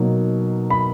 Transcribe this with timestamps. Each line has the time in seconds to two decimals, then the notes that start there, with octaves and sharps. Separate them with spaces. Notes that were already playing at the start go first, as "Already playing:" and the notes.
Already playing: B2 F#3 A#3 D#4
0.70 B5